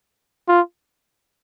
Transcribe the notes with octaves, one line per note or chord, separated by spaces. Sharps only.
F4